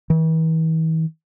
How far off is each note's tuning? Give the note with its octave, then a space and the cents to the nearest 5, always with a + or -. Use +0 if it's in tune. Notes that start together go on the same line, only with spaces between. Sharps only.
E3 -45